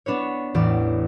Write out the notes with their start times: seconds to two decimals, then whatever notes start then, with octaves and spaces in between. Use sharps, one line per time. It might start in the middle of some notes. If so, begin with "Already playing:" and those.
0.06 B3 D4 B4 C#5
0.54 A1 E2 D5